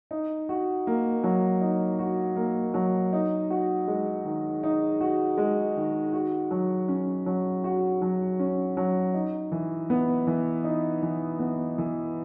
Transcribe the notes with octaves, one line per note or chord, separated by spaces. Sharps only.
D#4
F#4
A#3
F#3
D#4
F#4
A#3
F#3
D#4
F#4
G#3
D#3
D#4
F#4
G#3
D#3
F#4
F#3
C#4
F#3
F#4
F#3
C#4
F#3
D#4
E3
B3
E3
D#4
E3
B3
E3